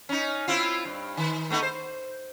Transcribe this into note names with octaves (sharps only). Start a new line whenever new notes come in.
C#4 D#4
C4 E4 F4
G2
D#3
A3 B3 D#4
C5